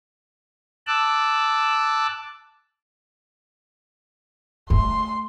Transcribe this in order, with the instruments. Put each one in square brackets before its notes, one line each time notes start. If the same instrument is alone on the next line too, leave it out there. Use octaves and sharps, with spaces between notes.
[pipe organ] A5 D6 E6 F#6
[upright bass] A3 [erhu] C6